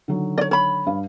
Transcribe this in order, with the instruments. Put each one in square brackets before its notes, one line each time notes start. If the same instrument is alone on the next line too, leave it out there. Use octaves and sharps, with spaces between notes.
[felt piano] D3 D#3 F#3
[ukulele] C#5 D5
C#5 B5
[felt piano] G2 F5